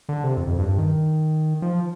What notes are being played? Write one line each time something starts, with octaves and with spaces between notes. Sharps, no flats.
D3
C3
F2
F2
G2
G2
D#3
F3